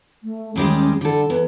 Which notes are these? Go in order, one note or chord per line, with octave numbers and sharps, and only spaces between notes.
A3
D#2 G3 G#3 C#4
D3 G3 A4
E2 B4